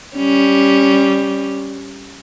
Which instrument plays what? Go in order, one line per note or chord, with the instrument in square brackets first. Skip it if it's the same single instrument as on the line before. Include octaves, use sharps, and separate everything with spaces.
[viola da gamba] G3 C#4